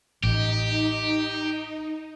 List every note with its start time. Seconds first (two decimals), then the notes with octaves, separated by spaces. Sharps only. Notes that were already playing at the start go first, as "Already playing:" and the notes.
0.23 A1 D#4 G4